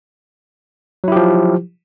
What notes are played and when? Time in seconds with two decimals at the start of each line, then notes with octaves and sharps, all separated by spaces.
1.04 F#3
1.08 E4
1.12 G4
1.16 F3